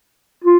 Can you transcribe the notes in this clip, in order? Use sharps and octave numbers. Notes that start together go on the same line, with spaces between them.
F4